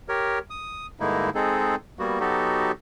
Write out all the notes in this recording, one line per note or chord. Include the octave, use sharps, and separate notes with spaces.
G4 A#4 C#5
D#6
G2 D3 G#3 A#3 D#4 E4
G#3 C4 D#4 G#4 A4
G3 A#3 B3 F#4
F#3 B3 D#4 F#4 G4 A4